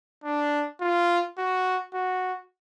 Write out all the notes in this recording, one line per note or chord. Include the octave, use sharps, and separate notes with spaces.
D4
F4
F#4
F#4